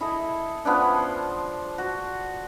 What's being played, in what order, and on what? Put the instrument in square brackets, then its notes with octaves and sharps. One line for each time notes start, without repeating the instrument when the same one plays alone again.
[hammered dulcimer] E4 G#4 A4 D#5
F3 B3 C#4 D4
C5
F#4